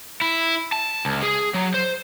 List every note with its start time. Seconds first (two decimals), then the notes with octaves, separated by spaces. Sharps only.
0.21 E4
0.72 A5
1.05 C#2
1.23 G#4
1.54 F#3
1.74 C5